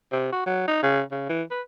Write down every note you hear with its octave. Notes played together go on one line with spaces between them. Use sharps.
C3
F#4
F#3
D#4
C#3
C#3
E3
B4